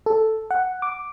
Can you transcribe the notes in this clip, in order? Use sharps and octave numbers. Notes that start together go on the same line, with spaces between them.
A4
F#5
D6